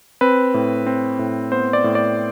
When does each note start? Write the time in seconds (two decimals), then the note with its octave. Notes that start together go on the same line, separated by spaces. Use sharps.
0.21 C4 B4
0.54 A2
0.86 C4
1.19 A2
1.52 B3 C5
1.73 D5
1.84 A2
1.95 D5